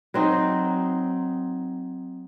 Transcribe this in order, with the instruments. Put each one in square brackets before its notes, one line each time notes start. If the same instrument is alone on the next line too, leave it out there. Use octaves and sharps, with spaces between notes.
[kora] F#3 C4 D#4